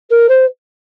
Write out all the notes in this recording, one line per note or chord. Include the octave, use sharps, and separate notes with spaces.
A#4
C5